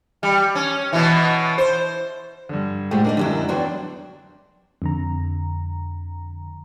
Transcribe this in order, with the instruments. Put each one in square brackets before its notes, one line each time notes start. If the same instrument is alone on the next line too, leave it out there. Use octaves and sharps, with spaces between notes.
[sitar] G3
C#4
B2 E3
C5
[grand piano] G2 D3
[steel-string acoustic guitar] A2 G#3 A3 [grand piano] G4 C5 F#5
[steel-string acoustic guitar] A#3 D#4 A#4 [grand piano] D4
[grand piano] F#2 G3 [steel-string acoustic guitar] D3 F#3 E4
[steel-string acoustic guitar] E2 F#3 D4 [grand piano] D5 G5 C6
[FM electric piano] F2 D3 A#5